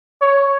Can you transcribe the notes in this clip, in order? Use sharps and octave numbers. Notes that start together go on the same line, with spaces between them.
C#5